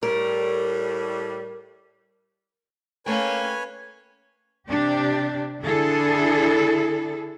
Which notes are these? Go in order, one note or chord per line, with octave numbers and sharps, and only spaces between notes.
A2 G3 A#4
A3 A#3 C#4 B4 C#5 G5 G#5
C3 D4 G4
D3 D4 E4 G#4 A4